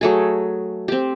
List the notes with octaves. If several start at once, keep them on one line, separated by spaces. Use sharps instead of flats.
F#3 A3 G#4
C4 G4